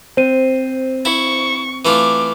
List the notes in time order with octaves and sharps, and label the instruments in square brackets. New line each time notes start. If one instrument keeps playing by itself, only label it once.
[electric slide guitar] C4 [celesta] C5 D#7
[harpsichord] E4 [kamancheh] C#6
[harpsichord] E3 A3 F4 [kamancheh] D6